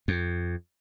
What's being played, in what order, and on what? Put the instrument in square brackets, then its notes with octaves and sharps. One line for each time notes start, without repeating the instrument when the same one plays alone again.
[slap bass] F2